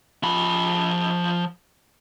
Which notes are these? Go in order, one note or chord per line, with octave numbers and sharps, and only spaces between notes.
F3 B5